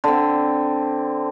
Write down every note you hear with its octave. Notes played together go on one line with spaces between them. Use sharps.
D3 C4